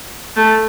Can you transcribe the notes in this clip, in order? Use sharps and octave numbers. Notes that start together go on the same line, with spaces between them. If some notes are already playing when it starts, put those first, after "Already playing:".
A3